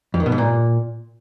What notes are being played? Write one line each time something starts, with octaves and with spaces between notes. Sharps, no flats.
F2
D#3
B2
G#2
A#2